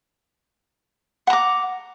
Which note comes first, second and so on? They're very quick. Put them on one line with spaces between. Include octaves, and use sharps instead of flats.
F#5 A#5 D6